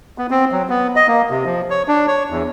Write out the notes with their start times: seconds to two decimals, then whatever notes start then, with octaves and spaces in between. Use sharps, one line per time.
0.18 B3
0.31 C4
0.52 F#3
0.69 B3
0.96 D#5
1.08 A#3
1.30 C3
1.46 F3
1.70 C#5
1.88 D4
2.08 C#5
2.30 E2